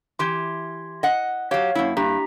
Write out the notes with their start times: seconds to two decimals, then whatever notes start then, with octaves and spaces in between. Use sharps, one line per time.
0.19 E3 G4 C6 G#6
1.03 D#5 F#5
1.51 F#3 G4 C#5 F5
1.75 F#2 A#3 E4
1.97 G2 G4 A#5 B6